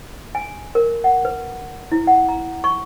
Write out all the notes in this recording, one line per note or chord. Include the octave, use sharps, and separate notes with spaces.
G#5
A#4
F#5
B4
E4
F#5
A#5
C#6